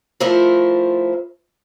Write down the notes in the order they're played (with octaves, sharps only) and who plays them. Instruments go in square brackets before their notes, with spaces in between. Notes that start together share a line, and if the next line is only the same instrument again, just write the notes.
[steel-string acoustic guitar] F3 A3 E4 A4 A#4 C5